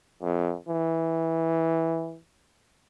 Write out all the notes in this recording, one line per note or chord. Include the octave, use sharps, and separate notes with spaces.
F2
E3